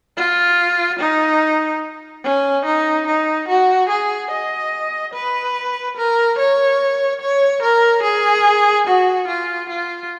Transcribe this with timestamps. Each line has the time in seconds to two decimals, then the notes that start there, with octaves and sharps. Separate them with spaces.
0.17 F4
1.00 D#4
2.24 C#4
2.65 D#4
3.07 D#4
3.48 F#4
3.90 G#4
4.31 D#5
5.14 B4
5.97 A#4
6.39 C#5
7.21 C#5
7.63 A#4
8.03 G#4
8.87 F#4
9.28 F4
9.70 F4